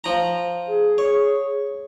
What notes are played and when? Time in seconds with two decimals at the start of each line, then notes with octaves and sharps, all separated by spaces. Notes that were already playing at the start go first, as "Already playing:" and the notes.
0.04 F3 A#5
0.68 G#4
0.98 C#5